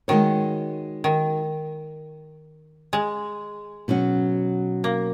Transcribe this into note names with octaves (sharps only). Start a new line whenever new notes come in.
D#3 G#3 D#4 F#4 C#5
D#3
G#3
B2 F#3 C#4 F#4
A#3